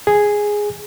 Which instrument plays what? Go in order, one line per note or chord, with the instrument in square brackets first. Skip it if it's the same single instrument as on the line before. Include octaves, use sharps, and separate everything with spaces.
[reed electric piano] G#4